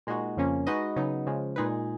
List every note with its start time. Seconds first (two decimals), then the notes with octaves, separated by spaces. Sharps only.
0.07 A#2 G#3 D#4 F#4
0.37 F2 C#3 F3 A#3 C#4
0.67 G#3 D#4 F#4 B4 D#5
0.96 C#3 F#3 B3 D#4
1.27 C#3 F3 G#3
1.56 A#2 G#3 D#4 G#4 B4